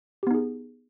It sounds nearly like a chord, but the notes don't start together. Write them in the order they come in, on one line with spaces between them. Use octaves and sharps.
G4 B3 D#4 G#4